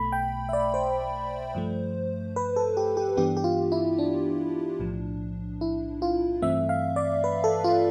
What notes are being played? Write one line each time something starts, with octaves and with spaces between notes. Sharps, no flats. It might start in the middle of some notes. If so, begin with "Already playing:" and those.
Already playing: B1 B2 A3 B5
G5
E5
D5
C5
G2 F3 A3
B4
A4
G4
G4
G2 E3 B3 D4 G4
G4
F4
E4
D4
B1 A2 F3
E4
F4
G2 E3 A3 C4 E5
F5
D5
B4
A4
F4